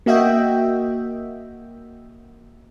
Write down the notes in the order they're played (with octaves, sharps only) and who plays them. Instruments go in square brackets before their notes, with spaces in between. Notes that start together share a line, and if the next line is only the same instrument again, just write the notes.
[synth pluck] A#3 F#4 D#5 E5 G5